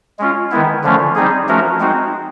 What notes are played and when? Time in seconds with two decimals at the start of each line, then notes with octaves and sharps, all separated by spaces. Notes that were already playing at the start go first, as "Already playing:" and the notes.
0.19 G#3 C#4 F4
0.51 D#3 G#3 B3 E4
0.83 D3 F3 A3 C#4
1.15 G3 C4 D#4 G#4
1.48 F3 A3 C#4 F#4 A#4
1.80 G#3 C4 D#4 F#4